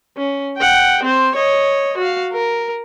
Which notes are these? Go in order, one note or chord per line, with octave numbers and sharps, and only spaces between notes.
C#4
F#5 G5
C4 C5
C#5 D#5
F#4 F5
A#4